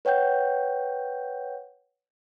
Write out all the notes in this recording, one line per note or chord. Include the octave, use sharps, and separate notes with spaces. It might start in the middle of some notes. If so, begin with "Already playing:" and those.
B4 C#5 F#5 G5 G6